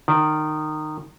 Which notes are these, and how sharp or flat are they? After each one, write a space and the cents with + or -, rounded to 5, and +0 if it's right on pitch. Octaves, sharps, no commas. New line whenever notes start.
D#3 -20 D5 +0